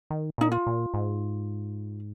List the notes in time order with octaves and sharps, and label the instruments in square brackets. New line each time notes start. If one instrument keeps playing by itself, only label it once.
[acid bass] D#3
[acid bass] A#2 [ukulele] D#4
[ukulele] F4
[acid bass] A#2
G#2